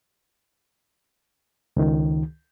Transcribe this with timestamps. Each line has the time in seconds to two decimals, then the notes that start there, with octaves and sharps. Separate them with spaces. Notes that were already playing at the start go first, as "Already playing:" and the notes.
1.77 C#2 D#3